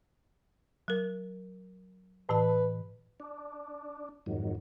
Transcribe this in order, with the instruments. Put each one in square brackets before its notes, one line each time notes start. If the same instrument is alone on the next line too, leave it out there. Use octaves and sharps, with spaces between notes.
[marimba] F#3 A#4
[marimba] A2 E3 A5 [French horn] B4
[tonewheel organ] D4
F2 G#2 D#3 F#3